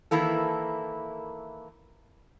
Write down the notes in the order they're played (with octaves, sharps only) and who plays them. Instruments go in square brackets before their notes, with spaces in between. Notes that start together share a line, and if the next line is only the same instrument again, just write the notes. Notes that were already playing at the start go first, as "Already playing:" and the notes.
[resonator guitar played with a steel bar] D#3 E3 A#3 E4 A4